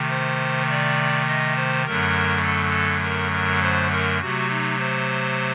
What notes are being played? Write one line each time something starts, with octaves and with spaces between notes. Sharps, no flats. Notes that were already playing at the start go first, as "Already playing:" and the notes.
Already playing: C3 D#3 A3
C5
D5
D#5
C5
F#2 D3 F#3 A3 A#4
A4
A#4
A#4
C5
A#4
C3 F#3 A3 F#4
D#4
C5